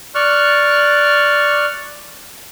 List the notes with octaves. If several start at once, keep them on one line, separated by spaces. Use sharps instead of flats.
D5 C#6 F6 F#6